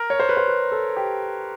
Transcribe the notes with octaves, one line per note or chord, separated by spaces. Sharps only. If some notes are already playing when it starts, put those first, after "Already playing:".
Already playing: A#4
C#5
C5
B4
C5
B4
A4
G4